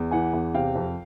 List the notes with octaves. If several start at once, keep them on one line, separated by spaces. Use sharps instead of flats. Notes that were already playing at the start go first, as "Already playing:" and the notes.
Already playing: E2
E3 F#5 G#5
E2
C3 F5 G5
F2